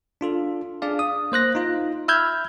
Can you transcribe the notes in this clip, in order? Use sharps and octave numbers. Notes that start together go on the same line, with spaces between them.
D4 F4 A4
D4 G#4 D5 F5
D#6
A#3 C5 F#6 A#6
D#4 F4
E5 B5 E6 F6 G6 G#6